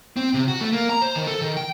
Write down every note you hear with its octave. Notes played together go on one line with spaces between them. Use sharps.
C4
C3
F#4
A3
A#3
A#5
C5
D#3
A4
D#3
G5